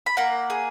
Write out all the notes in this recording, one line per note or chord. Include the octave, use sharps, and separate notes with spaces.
B5
A#3 F#5 A#5
G#4